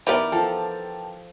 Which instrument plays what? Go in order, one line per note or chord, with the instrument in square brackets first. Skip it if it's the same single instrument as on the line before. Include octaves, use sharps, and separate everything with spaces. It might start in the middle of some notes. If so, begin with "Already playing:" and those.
[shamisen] E3 B3 D#4 [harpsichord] G4 A#4 D5
[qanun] F3 A4 [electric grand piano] G5 A5